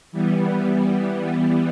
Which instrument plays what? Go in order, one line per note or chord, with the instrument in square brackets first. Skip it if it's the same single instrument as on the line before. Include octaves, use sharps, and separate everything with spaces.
[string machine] E3 G3 B3